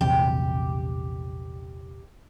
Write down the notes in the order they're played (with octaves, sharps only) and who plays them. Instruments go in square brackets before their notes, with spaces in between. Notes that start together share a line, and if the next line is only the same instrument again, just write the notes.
[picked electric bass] A#1 E2 C3 [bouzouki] G4